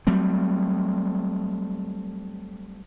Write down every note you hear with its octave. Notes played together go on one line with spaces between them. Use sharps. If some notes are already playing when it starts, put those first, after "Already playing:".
F#3 G3 A3 C4